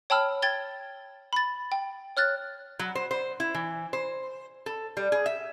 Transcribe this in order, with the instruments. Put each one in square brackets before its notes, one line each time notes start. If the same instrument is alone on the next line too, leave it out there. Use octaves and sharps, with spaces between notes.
[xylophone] C#5 G5 A5 B5 E6 F6
G5 G#6 A6 G7
B5 A6
G5
C#5 F6 F#6 A6
[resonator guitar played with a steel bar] F#3
C5
C5
E4
E3
C5
A4
G3
G#4
E5